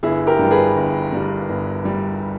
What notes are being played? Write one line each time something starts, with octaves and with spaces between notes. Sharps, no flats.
G1 E4 G#4
G4 A#4
G2 G3
G#4 B4
G1
G2 G3
G1
G3